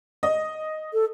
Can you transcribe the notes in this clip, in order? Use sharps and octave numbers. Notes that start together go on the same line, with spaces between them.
D#5
A4